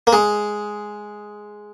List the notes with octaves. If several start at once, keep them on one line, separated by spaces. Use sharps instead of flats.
A#3
G#3